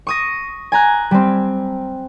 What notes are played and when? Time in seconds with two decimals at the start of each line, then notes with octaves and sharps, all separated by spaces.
0.07 C#6 D#6 A#6
0.72 G#5 A#5 F#6
1.11 G3 C4